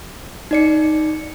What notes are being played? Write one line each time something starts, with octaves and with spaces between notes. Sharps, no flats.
D#4 D5 C#7